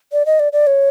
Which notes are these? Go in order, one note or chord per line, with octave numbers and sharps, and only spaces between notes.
D5
D#5
D5
D5
C#5